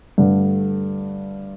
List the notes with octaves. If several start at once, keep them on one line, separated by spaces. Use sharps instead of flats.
G2 D3 A3